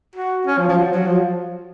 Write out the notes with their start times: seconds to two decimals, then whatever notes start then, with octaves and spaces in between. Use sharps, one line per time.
0.15 F#4
0.47 C#4
0.58 F3
0.69 F3
0.79 F#3
0.93 F#3
1.07 F3